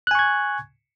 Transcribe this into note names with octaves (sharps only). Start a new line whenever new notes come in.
G#5 C#6 F#6 G#6